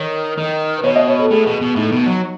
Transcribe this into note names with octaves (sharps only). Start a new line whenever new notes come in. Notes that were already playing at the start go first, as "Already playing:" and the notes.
Already playing: D#3 C#5
D#3
B4
B2 C#5
D#5
C#5
A4
A2 G#4
B2
B2
A2 D#4
B2
F#3